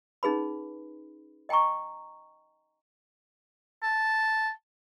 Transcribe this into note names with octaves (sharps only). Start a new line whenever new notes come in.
C#4 D#4 G#4 B4 B5
D#5 G5 G#5 A#5 C#6
A5